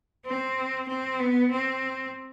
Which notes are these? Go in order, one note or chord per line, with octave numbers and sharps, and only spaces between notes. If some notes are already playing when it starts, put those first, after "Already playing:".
C4
C4
B3
C4